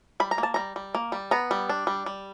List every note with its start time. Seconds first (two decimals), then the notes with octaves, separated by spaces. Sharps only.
0.20 G3 B5
0.31 A#5
0.38 A#3
0.43 A5
0.54 G3 A#5
0.76 G3
0.95 A#3
1.12 G3
1.31 B3 A#5
1.51 G3
1.69 D4
1.87 G3
2.06 G3